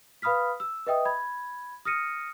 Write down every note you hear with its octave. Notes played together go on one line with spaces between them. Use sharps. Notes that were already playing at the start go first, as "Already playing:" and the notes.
B4 F5 B5 D#6 F6 B6
E6
B4 D#5 E5 G5 D#6
B5 G#6
D#6 F6 A#6 C#7 D#7